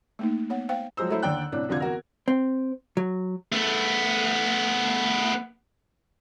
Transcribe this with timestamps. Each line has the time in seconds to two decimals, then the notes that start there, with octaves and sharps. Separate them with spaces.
0.19 A3 A#3 D#4
0.50 B3 C#5 F#5
0.69 C5 F5 G5
0.97 F3 F#3 G#3 C5 E6
1.09 F#3 A3 E4 C5
1.22 D#2 D3 D5 G5 F#6
1.52 C2 A2 D4
1.69 F1 D3 D4 F4 G#6
1.80 E2 F#4 A#4
2.28 C4
2.97 F#3
3.52 A3 B3